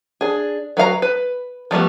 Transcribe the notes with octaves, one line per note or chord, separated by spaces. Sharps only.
D4 G#4
F#3 B4 F5 A#5
B4
F3 G3 A3 B3